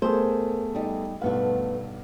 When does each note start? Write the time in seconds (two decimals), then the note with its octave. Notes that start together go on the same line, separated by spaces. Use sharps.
0.02 A3 B3 G#4 A#4 C5
0.75 G3 D#4
1.21 B1 G2 A3 B3 B4 F5